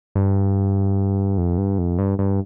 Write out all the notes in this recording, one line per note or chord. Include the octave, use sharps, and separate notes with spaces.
G2
F2
G2
F2
G2
G2